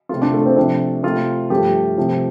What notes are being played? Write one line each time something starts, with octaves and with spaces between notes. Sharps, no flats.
C3 A3 F4
D4
A3
C4
C3 F3 A3 D4
C3 A3 F4
G2 F3 A3 G4
C3 F3 A3